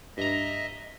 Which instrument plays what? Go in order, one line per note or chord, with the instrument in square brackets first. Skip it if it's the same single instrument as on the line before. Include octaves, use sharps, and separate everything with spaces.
[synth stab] G2 A#5 [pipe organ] D#5 E5